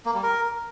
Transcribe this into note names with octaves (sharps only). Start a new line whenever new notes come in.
A#3
G3
A#4